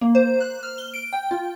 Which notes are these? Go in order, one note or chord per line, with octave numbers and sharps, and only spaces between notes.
A#3
C5
F#6
F6
G7
D7
G5
F4